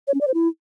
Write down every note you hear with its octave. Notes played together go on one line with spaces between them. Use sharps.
C#5
C#4
D5
C5
E4